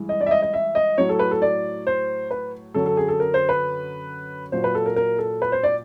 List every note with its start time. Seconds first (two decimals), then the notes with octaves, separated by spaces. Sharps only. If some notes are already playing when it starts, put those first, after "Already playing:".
Already playing: G2 E3 G#3
0.09 D#5
0.21 D5
0.26 E5
0.31 D#5
0.42 D#5
0.53 E5
0.75 D#5
0.98 A2 F#3 C#5
1.09 A4
1.19 B4
1.31 A4
1.42 D5
1.87 C5
2.31 B4
2.74 F#2 D3 F#3 A4
2.86 A4
2.97 G#4
3.08 A4
3.20 A#4
3.34 C5
3.49 B4
4.52 A#2 F#3 C5
4.64 B4
4.75 A4
4.86 A#4
4.96 A#4
5.18 A4
5.42 B4
5.52 C5
5.63 D5